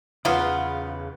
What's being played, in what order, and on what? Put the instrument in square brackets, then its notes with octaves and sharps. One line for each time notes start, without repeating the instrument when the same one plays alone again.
[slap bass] E2 C#3 [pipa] F#3 B3 F4 [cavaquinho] B4 F#5